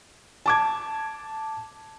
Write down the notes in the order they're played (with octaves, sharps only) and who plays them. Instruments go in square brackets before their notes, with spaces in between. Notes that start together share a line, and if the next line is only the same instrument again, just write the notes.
[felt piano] A5 D6 G#6